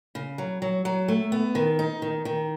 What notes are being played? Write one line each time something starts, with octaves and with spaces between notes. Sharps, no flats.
C#3
F#3
F#3
F#3
A3
B3
D#3
D#4
D#3
D#3